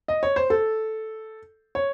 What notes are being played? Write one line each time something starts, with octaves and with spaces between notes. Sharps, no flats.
D#5
C#5
C5
A4
C#5